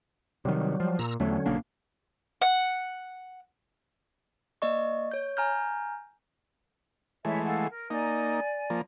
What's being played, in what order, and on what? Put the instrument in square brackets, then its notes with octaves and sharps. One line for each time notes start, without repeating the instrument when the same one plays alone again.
[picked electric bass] C3 D#3 [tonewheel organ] F#3 G3
[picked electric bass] F3
[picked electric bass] A#2 [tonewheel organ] A#5 E6
[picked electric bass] E2 A3 [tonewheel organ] D3 F#3 C#4
[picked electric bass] B1 A#3 D4
[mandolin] F#5
[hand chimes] A#3 D5 D#5 C#6
C#5 G6
G#5 A#5 F6 G6
[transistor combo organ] E3 G#3 A3 [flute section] E4 C#5 E5
[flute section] A4 F5 F#5
A#4
[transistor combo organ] A#3 D#4 [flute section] D5 G#5
[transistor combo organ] F3 A#3